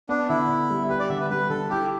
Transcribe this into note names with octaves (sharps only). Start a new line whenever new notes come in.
B3 D4
D3 E4
D3
G3
G4 B4
D5
D3 E5
B4
G3 B4
D3 A4
E4 G4